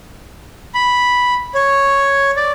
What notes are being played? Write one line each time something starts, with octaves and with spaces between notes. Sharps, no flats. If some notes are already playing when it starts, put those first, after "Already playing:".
B5
C#5
D5